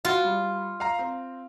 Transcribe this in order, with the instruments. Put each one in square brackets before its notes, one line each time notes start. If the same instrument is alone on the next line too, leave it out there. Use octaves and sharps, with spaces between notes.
[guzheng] F4 [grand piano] F#4
[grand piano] G3
F5 A#5
C4